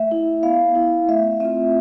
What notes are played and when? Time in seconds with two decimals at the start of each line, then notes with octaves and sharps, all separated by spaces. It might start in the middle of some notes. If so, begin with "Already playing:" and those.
Already playing: A3 E5
0.11 E4
0.43 B3 F5
0.75 E4
1.08 A3 E5
1.40 C4 F4 E5